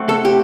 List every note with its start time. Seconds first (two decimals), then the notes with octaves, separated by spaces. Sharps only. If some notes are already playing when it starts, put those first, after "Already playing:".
Already playing: A3 C4 F#4
0.09 A4
0.25 G4